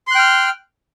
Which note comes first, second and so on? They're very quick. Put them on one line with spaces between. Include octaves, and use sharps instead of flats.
C6 F#6 G5 F6